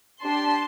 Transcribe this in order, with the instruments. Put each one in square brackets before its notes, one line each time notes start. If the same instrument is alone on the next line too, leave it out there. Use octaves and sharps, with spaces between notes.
[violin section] D4 G4 A5 C6